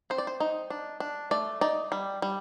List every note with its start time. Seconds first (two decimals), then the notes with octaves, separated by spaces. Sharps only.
0.10 C4 C5
0.18 D5
0.27 C5
0.40 D#4
0.70 D4
1.00 D4
1.31 A3 D5
1.61 D#4 D5
1.92 G3
2.22 G3